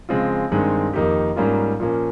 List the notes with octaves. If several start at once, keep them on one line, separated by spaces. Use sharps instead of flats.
C#3 F3 G#3 C4 F4
G2 D#3 G#3 C4
F2 D#3 A#3 D#4 G4
G#2 G3 A#3 C#4 F4
A#2 F3 A#3 C#4